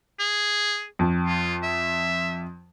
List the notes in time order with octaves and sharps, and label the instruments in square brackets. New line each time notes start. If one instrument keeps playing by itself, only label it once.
[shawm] G#4
[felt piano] F2
[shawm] F4
E5